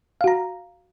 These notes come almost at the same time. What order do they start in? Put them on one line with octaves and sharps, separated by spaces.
F5 F#4 A#5